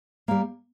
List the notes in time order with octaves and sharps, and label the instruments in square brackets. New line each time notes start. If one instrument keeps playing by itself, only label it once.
[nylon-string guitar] G3 A#3